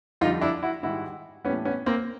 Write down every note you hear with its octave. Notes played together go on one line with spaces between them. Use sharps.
F2 D3 G3 D#4 F4
D4 E4
E4 F#4
G#2 D#3 G3 E4 F#4
A2 E3 G3 B3 C#4
B3 C#4
A#3 C4